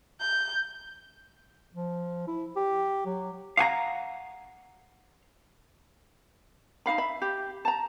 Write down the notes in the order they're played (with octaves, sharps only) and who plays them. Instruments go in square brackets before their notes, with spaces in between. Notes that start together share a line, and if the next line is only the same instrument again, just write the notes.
[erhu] G6
[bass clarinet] F3
E4
G4
F#3
[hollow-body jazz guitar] F5 F#5 G#5 A#5
[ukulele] D#4 F4 F5 B5
E5 B5
G4
A5 A#5